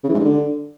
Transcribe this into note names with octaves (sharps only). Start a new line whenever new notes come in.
C#3
E3
G#2
G2
D3